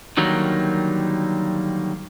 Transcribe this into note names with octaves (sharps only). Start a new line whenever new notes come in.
D3 D#3 F#3 G3 A#3 D#4